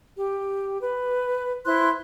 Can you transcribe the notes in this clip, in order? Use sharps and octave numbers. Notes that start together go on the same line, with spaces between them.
G4
B4
E4 C5 C6 F#6